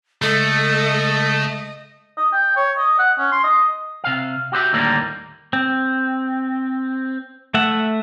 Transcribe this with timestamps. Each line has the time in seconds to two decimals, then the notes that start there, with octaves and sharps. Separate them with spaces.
0.22 C#3 G#3 A3 A4 D#5
2.17 D#5
2.33 G5
2.56 C#5
2.78 D#5
2.99 F#5
3.19 C#4
3.32 C6
3.44 D#5
4.04 C3 F5
4.52 F#4 G4 C5 E5
4.73 D#2 A2 D3 G3 A#3 A#4
5.53 C4
7.54 A3 E5 F#5